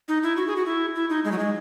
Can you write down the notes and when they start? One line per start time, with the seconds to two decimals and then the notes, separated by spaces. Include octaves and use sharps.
0.08 D#4
0.23 E4
0.37 F#4
0.47 G#4
0.56 F#4
0.66 E4
0.95 E4
1.10 D#4
1.25 G#3
1.32 F#3
1.39 G#3